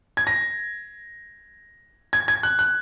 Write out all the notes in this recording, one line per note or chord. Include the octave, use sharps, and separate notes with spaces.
G#6
A#6
G#6
G#6
F#6
F#6